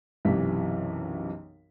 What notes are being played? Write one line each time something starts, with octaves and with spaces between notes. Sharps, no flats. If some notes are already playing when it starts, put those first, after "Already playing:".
B1 F#2 C3 E3 B6